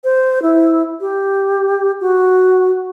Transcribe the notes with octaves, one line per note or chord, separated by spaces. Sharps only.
C5
E4
G4
F#4